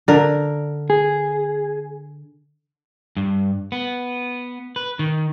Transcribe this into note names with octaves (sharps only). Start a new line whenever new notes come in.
D3 A#4
G#4
G2
B3
B4
D#3